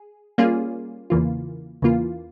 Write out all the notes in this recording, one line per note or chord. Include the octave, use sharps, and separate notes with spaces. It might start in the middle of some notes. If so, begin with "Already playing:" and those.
Already playing: G#4
G3 A#3 C#4 F4 G#4
E2 C#3 E3 A#3 F4
E2 C#3 E3 A#3 F4